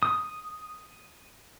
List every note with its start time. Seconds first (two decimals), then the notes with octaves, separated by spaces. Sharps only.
0.03 D#6